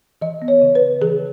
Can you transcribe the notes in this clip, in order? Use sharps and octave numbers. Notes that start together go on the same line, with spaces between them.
E3 D#5
B3
C#5
C#3
B4
C#3
E3 G#4